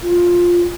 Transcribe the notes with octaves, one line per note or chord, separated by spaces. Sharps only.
F4